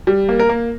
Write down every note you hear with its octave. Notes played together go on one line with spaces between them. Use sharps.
G3
A#3
A#4
A#3